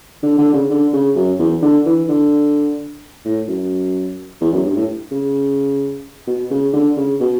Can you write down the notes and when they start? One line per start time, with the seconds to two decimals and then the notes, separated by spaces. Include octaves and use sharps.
0.23 D3
0.38 D3
0.54 C#3
0.70 D3
0.93 C#3
1.16 F#2
1.39 E2
1.62 D3
1.86 E3
2.09 D3
3.25 A2
3.48 F#2
4.41 E2
4.53 F#2
4.65 G2
4.76 A2
5.11 C#3
6.27 B2
6.51 C#3
6.73 D3
6.97 C#3
7.20 B2